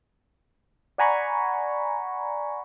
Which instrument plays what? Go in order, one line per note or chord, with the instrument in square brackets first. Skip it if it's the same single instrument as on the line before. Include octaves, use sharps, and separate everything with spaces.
[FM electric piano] D5 F#5 G#5 A#5 B5 C#6